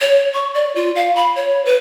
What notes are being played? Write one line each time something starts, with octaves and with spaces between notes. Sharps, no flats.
C#5
C#6
D5
F4
F5
B5
C#5
B4